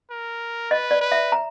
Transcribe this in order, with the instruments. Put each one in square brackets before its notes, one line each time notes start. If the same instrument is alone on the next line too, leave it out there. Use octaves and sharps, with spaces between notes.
[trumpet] A#4
[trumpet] B4 [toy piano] D#5
[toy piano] D5
[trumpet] B4
[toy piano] E5
A#5